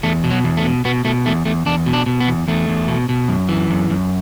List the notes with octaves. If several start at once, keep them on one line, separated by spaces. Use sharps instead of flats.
E2 A3
B2
F#3
E2
A3
B2
B2 B3
B2 A3
E2 A3
E2 A3
E2 D4
B2
D4
B2
B3
E2
E2 A3
E2
B2
B2
F#2
E3
F#2
F#2